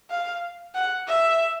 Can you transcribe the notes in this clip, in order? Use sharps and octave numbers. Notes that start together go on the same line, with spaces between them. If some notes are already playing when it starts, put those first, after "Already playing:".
F5
F#5
E5